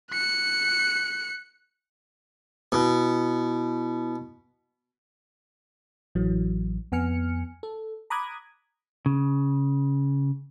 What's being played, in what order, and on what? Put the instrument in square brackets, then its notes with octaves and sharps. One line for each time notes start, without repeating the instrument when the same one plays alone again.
[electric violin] F#6 C#7
[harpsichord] B2 [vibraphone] E4
[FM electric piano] A1 E3 F#3
F2 B3 G#5 F6 C#7
A4
A#5 B5 D6 D#6 F#6 G#6
[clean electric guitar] C#3